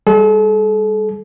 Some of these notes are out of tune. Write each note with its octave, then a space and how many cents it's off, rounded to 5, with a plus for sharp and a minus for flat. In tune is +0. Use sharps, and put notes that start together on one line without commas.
G3 +30 A4 -40